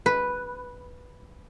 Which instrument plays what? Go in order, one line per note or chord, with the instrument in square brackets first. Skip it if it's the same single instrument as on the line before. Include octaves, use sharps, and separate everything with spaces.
[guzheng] B4